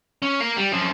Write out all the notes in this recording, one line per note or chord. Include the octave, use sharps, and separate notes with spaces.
C#4
A#4 F5
G3
F#2 F3